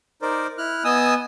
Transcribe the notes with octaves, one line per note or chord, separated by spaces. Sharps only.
D#4 A#4 C5 D5
E4 F6 F#6
B3 D#5 G#5 D#6 E6